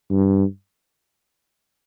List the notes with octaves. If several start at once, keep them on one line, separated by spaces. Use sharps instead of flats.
G2